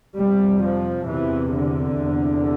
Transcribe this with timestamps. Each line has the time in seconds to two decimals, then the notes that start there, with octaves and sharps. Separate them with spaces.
0.16 F2 C3 G3
0.63 F3
1.07 E2 C3 E3
1.54 D3
1.99 E2 C3